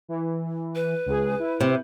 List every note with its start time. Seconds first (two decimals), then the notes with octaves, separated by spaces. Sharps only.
0.08 E3
0.75 B4
1.06 C#2 G#4
1.39 E4
1.61 C3